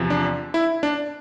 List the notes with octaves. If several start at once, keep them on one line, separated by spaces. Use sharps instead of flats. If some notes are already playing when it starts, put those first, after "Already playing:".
Already playing: E2 C3 F3
D4
E4
D4